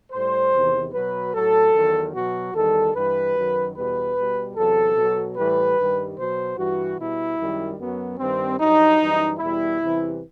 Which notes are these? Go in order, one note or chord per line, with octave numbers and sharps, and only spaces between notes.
A2 G3 C5
E2 C3 D#3
B2 F#3 B4
A2 F#3 A4
E2 D#3 F#3
B2 F#3 F#4
E2 D#3 G3 A4
G2 E3 G3 B4
F#2 D#3 F#3
E2 B2 G3 B4
B2 G3
E2 C3 F#3 A4
B2 F#3
A2 E3 G3 B4
G2 D#3 G3
B2 F#3 C5
G2 E3 G3 F#4
B2 G3 E4
F#2 D#3 G3
F#2 F#3 B3
G2 D#3 G3 C4
G2 F#3 D#4
F#2 E3 G3
E2 B2 G3 E4
E2 C3 E3 G3